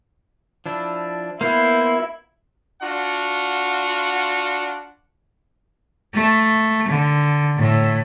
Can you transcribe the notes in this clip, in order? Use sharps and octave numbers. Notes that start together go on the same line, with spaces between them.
F3 D4 E4
A#3 B3 E4 C5
D4 F4 F#4 F#5
A3
D3
A2